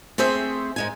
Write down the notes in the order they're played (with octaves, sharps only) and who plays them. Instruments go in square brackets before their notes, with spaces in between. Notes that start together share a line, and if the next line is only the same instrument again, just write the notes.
[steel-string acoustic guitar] A3 C4 G#4 C5 E5
G#2 G#3 G#5